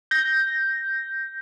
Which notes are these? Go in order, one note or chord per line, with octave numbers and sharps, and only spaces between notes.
G6 A#6